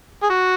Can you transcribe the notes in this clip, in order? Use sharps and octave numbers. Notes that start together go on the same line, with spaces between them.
G#4
F#4